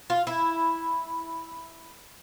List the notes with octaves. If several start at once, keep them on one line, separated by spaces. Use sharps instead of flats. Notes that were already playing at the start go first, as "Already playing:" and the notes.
F4
E4